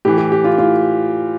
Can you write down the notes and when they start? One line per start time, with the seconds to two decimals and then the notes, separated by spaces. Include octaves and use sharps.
0.05 A2 E3 G4
0.18 G4
0.32 G4
0.44 F4
0.58 A2 F4